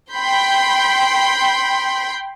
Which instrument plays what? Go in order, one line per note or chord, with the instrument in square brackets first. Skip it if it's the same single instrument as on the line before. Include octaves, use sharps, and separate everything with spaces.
[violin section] G5 B5 C6 G6